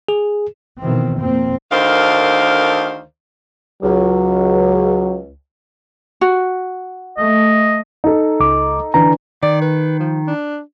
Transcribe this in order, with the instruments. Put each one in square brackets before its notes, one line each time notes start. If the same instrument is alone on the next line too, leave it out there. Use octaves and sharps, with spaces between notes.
[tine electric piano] G#4
[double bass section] B2 D#3 E3 C4
F2 B2 A#3 C4
[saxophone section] D2 D3 D#3 A#4 C5 F5
[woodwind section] C#2 [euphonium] F#3
[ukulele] F#4
[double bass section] A3 [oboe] D#5
[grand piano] D#4 A4
[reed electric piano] C#2 D6
[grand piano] D3 E3 [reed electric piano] A#5
[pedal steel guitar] D#3 [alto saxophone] D5
[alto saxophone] B4
F3
D4